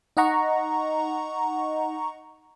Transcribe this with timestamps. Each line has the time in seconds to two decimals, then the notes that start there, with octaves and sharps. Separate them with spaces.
0.17 D#4 D#5 F#5 A#5 C#6